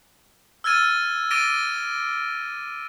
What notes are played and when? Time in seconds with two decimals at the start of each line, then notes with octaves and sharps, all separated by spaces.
0.64 E6 F6 G#6 A6 D#7
1.30 D6 A6 A#6 D7 D#7 G7